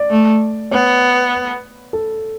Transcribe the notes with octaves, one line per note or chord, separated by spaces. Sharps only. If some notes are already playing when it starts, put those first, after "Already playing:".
Already playing: D5
A3
B3 C#5
A4